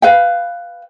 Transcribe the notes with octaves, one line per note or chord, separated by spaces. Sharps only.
B4 F5 G5